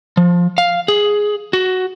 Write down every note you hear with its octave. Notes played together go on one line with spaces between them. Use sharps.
F3
F5
G#4
F#4